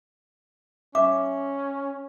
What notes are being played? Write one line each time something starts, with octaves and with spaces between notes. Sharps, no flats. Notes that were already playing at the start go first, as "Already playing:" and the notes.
C#4 E5 D6